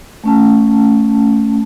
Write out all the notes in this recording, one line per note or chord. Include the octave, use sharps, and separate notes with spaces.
A3 C#4 A5